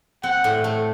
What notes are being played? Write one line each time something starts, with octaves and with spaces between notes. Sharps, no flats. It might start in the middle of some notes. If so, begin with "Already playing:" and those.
C4 F#5
A2
A3